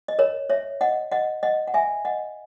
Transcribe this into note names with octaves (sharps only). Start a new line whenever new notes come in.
D#5
A#4 C#5
C#5 E5
D#5 F#5
D#5 F#5
D#5 F#5
F#5
E5 G#5
D#5 F#5